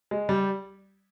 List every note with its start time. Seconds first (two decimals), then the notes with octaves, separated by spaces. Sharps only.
0.11 G#3
0.29 G3